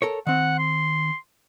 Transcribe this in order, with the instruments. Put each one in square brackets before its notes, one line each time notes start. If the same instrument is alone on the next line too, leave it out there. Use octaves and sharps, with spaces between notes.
[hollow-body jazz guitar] A4 A#4 C#5
[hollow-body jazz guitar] D#3 C4 [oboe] F#5
[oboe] C6